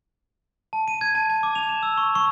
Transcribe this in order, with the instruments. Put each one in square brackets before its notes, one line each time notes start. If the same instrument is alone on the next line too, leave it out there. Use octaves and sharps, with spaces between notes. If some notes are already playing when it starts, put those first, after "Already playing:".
[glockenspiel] A5
D#7
G#6
A5
A5
D6
F7
E7
E6
C#6
C#6